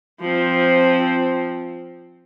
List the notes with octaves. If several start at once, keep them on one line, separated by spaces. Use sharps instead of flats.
F3 C4